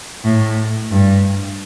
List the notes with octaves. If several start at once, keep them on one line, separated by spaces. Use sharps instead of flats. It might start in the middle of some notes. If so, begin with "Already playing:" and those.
A2
G2